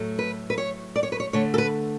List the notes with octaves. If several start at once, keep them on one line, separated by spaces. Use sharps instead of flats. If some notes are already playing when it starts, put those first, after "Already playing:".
Already playing: A2 F#3 A3
B4
B4
C#5
D5
C#5
B4
C#5
D3 A3 C#5
A4
B4